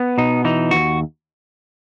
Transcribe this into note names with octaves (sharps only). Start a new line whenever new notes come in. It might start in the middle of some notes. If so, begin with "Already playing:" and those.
Already playing: B3
B2 D#4
E3 D#4
D#2 F#4